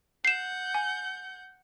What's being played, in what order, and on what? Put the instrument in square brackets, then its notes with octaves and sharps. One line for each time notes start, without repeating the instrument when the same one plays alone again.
[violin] F#5 G6 [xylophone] C7 E7
[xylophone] G#5